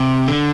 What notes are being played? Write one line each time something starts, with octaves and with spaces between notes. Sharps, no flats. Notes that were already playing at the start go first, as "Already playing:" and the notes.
Already playing: C3
D3